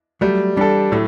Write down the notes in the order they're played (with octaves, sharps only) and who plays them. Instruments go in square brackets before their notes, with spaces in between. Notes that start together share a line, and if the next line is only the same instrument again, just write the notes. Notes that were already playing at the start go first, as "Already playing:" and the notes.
[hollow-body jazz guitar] F#3 A3 [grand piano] G3
[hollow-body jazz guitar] E3 G3 [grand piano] D4 A4
[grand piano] A2 [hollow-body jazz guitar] F#3 A3